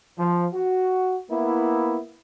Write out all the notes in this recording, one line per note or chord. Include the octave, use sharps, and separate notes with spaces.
F3
F#4
A#3 B3 E4